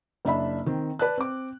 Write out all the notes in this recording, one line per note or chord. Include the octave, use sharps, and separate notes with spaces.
F#1 D4 E5 B5
D#3 C4
B4 D5 A5 F#6
C4 D6